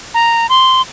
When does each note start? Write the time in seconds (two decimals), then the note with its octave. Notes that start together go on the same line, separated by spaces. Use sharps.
0.14 A#5
0.49 C6